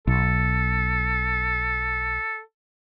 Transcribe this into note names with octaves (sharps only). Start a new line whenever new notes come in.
B1 A4